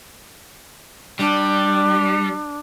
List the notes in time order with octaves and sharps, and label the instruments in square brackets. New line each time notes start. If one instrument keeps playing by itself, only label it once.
[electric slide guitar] G3 [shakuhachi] D4